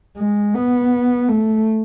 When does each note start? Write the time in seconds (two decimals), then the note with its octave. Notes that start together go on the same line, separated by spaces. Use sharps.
0.17 G#3
0.54 B3
1.28 A3